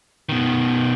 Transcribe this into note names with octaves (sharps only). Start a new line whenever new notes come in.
B2 D#3